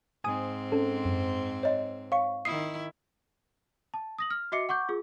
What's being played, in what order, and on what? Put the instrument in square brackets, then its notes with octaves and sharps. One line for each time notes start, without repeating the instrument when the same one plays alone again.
[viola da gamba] G#2 C4 [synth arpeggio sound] G#5 D#6
[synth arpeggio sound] C#4 A4
F#2
[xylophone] C#5 D#5
[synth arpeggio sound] C#5 C#6 [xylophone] F5
[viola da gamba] D#3 E4 [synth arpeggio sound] D#6 [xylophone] C7
[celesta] A5
D#6 A#6 F#7
F6
F#4 D#5 E5 D6 C7 C#7
F#5 C#6 D6 G6
F4 G#4